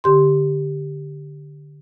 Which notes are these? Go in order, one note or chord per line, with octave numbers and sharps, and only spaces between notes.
D3 G4 C6